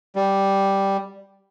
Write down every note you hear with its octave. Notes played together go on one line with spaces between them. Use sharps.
G3